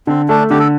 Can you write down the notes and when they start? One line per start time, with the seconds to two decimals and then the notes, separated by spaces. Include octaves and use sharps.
0.07 D3 C4
0.28 A3 D4
0.50 D3 G4
0.59 A4